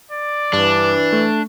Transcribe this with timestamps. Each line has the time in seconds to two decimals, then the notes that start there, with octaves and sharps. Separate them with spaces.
0.11 D5
0.53 G2 E3 D4
1.13 A3